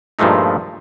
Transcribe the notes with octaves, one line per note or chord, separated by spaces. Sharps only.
G2 A#2 F3 G#3 A3 D#4